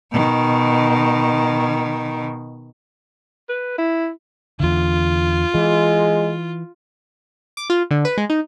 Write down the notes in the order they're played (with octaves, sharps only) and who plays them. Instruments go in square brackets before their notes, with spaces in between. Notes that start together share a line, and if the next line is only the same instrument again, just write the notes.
[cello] B2 D#3
[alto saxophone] B4
E4
[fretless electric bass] E2 D3 [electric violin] F4
[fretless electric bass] E3 [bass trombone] G#3
[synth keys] D6
F4
D3
B4
G#3
D#4